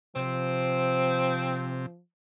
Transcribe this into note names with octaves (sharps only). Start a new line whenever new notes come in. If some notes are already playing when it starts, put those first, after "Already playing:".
C3 F3 C4